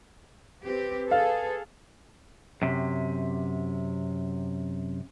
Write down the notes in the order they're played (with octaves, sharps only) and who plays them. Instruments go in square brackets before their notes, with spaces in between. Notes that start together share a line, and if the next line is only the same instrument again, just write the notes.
[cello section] C4 G4 [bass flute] B4
[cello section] G#4 A4 [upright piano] F5
[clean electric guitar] F#2 C3